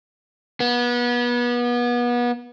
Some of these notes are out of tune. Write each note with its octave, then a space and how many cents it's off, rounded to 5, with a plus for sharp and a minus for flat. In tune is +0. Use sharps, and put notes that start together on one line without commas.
B3 -30